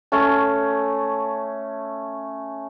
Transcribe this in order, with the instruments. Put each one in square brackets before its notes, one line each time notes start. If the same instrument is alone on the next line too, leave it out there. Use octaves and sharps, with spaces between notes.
[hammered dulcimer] A3 C#4 A5